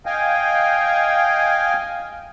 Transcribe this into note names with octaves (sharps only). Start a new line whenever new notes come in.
D#5 F5 G5 G#5